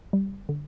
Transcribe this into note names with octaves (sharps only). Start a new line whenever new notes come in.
G3
D3